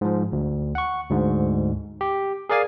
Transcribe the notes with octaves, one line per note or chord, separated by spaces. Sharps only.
G#2 F3
D2
F#5 C#6
D2 G#2
G4
G#4 A#4 D5 F5 G#5